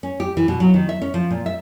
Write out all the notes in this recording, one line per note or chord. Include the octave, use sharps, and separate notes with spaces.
C#4
G4
E3
B2
F#3
D#3
E5
C#4
F3
A#2
E5